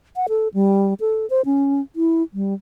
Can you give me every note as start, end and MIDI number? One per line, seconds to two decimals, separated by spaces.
0.16 0.27 78
0.29 0.48 69
0.54 0.94 55
1.00 1.28 69
1.30 1.42 72
1.45 1.81 61
1.96 2.23 64
2.34 2.54 55